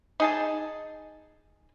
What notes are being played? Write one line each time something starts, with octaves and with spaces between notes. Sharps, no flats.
D#4 G#4 A5